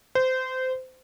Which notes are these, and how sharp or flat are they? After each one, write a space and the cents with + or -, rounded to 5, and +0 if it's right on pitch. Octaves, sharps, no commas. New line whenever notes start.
C5 -20